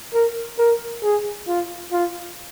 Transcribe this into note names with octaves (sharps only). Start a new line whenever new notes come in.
A#4
A#4
G#4
F4
F4